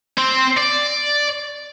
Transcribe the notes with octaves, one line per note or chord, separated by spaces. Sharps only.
C4
D5